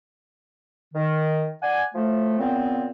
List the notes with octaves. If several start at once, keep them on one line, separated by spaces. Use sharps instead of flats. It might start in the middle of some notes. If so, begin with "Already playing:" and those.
D#3
D5 F#5 G#5
A2 F3 A3
A#2 C#3 B3 C4